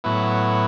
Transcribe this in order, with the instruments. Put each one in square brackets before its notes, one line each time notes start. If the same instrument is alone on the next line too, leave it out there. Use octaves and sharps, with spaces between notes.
[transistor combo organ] A2 F#3 B3 E4